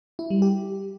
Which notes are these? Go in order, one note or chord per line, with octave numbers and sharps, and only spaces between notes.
E4
G3
G4